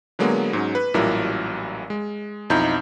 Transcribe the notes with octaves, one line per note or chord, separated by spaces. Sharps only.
D3 F#3 G#3 A#3 B3
G#2 F#3 C#4
B4
A1 A#2 F#3 G3 E4 A#4
G#3
B1 F2 D#4 E4 A#5 G6